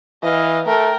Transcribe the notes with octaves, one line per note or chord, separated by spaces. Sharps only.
E3 D#5 F5
A3 A#4 G5